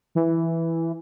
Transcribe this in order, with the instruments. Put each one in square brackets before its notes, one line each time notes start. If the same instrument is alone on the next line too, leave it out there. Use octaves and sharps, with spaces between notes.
[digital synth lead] E3